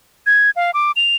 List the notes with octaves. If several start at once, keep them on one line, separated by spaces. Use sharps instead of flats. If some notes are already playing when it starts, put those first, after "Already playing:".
G#6
F5
D6
F7